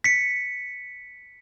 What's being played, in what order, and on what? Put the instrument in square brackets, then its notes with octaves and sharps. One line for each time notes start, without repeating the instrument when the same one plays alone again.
[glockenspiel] B6 C#7